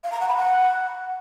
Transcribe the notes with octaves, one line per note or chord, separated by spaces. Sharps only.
F5
A#5
F#5
B5
F#5